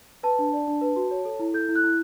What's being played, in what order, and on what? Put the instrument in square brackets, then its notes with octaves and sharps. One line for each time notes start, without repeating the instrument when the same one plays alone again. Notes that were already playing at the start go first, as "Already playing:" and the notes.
[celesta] B4 A5
D4
D5
D4
B4
F#4
C#5
A4
E4
A4 G6
E4
F#6
E4